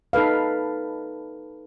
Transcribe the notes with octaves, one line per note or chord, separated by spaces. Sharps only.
D#4 A4 B4 F5